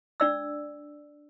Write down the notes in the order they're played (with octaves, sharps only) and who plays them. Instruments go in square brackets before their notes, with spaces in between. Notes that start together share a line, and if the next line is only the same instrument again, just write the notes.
[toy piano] D4 D5 E6